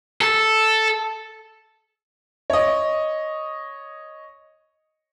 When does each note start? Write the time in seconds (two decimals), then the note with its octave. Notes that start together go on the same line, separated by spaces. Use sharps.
0.21 A4
2.50 C#5 D#5